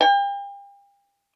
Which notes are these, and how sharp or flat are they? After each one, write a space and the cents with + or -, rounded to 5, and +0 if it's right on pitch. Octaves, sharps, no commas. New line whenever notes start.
G5 +40